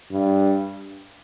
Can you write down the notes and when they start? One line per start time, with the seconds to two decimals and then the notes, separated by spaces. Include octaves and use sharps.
0.11 G2